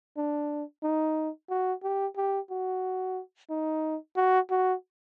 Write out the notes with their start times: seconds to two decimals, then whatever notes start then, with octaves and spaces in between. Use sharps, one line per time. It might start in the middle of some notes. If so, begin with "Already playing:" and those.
0.17 D4
0.83 D#4
1.50 F#4
1.83 G4
2.17 G4
2.51 F#4
3.50 D#4
4.17 F#4
4.51 F#4